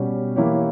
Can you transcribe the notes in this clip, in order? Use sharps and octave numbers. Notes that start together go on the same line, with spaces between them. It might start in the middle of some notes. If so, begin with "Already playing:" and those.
Already playing: B2 G3 C#4 G4
E3 A#3 E4 G4 C#5